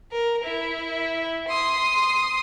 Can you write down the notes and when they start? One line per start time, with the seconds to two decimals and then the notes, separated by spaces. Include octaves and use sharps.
0.12 A#4
0.44 E4
1.48 C6 D#6